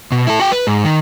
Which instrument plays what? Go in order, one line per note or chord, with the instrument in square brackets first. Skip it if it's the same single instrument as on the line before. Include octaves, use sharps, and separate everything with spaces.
[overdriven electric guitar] B2
E4 A4
F#4 G5
B4
G#2
D#3